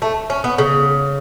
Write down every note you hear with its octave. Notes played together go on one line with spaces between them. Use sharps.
A3
C#4
B3
C#3